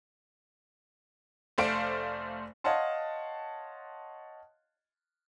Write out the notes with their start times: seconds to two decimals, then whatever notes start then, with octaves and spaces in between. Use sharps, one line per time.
1.58 F1 A3 C5 D5 F5 D7
2.64 C#5 D#5 F5 F#5 A5 C6